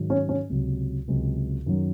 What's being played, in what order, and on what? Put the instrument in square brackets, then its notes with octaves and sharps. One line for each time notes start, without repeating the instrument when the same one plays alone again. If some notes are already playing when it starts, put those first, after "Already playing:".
Already playing: [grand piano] G#2 D#3 F#3
C#4
C#4
C#2 C3 F#3
C#2 C3 F#3
F#2 D#3 F#3